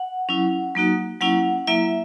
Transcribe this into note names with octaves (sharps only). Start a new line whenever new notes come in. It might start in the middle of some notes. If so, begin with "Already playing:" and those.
Already playing: F#5
F#3 C#4 E4
F#3 A#3 D#4 F#4
F#3 A#3 C#4 E4 F#5
F#3 A#3 E4 E5